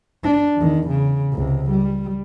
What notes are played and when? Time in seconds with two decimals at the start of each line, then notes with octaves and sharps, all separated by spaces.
0.24 D4
0.56 E2 D#3
0.88 C#3
1.32 C#2 C3
1.70 G3